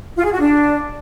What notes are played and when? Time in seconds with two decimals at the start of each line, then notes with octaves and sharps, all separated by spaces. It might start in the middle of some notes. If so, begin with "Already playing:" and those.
0.17 F4
0.25 G#4
0.32 F#4
0.40 D4